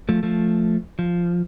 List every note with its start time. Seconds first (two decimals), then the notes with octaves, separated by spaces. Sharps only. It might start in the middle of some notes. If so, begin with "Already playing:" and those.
0.09 F3 A3
0.23 F3 A3
0.99 F3